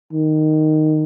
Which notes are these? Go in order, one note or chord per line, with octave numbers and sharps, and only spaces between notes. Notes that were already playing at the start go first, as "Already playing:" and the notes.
D#3